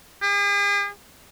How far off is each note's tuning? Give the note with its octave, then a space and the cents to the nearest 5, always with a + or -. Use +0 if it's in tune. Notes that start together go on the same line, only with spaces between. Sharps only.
G#4 -45